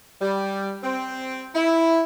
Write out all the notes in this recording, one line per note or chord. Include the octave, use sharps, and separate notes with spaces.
G3
C4
E4